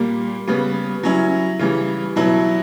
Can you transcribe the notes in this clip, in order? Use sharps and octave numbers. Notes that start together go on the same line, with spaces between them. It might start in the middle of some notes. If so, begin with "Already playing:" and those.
Already playing: A#2 G3 A#3
C#3 G3 B3
F#3 C#4 E4
C#3 E3 G3
B2 F#3 B3 E4